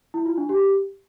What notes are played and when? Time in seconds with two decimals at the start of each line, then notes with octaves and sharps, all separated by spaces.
0.14 E4
0.26 F4
0.38 D4
0.49 G4